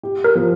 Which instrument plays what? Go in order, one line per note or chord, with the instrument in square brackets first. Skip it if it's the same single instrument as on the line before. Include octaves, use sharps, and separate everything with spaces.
[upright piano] G4
[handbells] A#4
[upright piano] F3